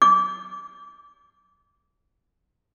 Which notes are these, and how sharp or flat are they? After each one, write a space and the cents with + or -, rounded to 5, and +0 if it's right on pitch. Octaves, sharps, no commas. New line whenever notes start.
D6 -25